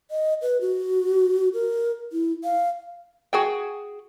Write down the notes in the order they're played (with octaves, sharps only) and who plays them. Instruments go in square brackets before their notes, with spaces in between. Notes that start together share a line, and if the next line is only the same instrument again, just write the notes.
[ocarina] D#5
B4
F#4
A#4
E4
F5
[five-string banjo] F#4 G#4 G5